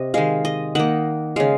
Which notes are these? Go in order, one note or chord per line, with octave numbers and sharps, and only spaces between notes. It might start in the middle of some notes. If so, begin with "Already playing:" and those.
Already playing: C3 D#5
D#3 G#3 F5
D#5
D#3 A#3 F#5
C#3 G#3 F5